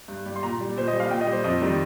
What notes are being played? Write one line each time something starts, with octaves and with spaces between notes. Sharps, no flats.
G2
G3
C6
A#2 A#5
G3
A#2 C5
D#5
G3
F5
A#2 G5
D#5
G3
C5
F2 D#5
D#3 G3